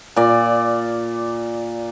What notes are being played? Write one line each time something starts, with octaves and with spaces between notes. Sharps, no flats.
A#2 D5